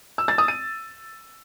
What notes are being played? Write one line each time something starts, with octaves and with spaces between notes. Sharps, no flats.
E6
A6
D#6
D#7